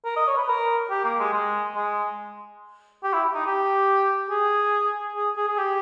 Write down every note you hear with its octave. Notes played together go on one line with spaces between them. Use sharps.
A#4
D#5
C#5
B4
A#4
G4
A#3
G#3
G#3
G#3
G4
E4
D#4
G4
G#4
G#4
G#4
G#4
G4